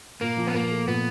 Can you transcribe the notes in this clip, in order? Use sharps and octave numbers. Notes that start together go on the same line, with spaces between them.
A#2 A#3
F3
B3
A#2 A#3
A3
A#2 B3